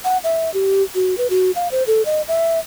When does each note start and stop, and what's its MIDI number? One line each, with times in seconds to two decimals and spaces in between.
0.05 0.18 78
0.24 0.52 76
0.54 0.83 67
0.95 1.17 66
1.18 1.27 71
1.30 1.51 66
1.55 1.68 77
1.72 1.83 72
1.87 2.05 69
2.05 2.22 75
2.28 2.59 76